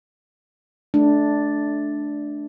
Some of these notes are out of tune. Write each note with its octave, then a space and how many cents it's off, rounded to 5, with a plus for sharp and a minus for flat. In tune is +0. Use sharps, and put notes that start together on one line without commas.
A3 -25 D4 +0